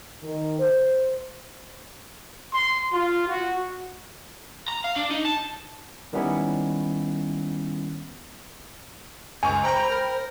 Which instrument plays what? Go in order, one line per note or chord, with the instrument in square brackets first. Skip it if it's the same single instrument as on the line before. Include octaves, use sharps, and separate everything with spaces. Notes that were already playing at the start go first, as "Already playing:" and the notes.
[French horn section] D#3
C5
[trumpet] C6
F4
F#4
[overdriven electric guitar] A#5
F5
D4
D#4
A5
[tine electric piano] D#3 G3 B3 C#4 E4
[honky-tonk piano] C#2 C#6 [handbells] G#5
[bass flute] C5 [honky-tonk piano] G5 B5 G6 [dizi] A#5
[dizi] A#4